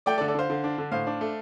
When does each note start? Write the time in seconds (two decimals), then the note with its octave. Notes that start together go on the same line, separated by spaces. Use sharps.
0.06 A3 D5 G5
0.18 A4 D5
0.21 D3
0.28 A4 D5
0.35 D3 C5 F5
0.50 D3
0.64 D4
0.78 D3
0.92 A2 C5 F5
1.07 D4
1.21 A3